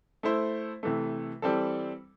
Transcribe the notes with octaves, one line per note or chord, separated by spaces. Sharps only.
A3 E4 C5
C3 E3 A3
E3 G3 C4 A4